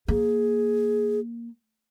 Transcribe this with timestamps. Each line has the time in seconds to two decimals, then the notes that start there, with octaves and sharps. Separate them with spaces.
0.08 A#3 G#4